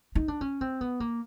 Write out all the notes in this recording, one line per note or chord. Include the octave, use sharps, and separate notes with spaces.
D#4
D4
C#4
C4
B3
A#3